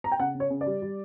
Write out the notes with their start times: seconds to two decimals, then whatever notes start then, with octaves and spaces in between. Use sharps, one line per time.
0.04 A#5
0.12 G5
0.19 C#3 F#5
0.35 C#3
0.40 C#5
0.50 C#3
0.61 D5
0.66 G3
0.82 G3